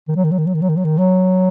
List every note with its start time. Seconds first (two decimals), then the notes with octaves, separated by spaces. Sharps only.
0.08 D#3
0.16 F#3
0.24 D#3
0.31 F#3
0.39 D#3
0.47 F#3
0.54 D#3
0.62 F#3
0.69 D#3
0.77 F#3
0.85 D#3
0.98 F#3